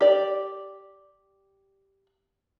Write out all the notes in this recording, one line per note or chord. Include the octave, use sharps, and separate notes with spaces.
G4 D5